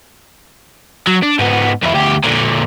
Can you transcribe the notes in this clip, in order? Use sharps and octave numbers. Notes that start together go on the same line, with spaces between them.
F#3
D4
G#2 B3
F2 E4
D2 G4
A#2 D3